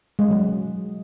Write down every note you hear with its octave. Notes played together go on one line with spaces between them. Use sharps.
G#3
F#3